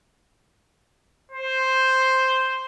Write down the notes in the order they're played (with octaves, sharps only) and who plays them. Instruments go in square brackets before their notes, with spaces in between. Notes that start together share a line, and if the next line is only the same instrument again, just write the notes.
[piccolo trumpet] C5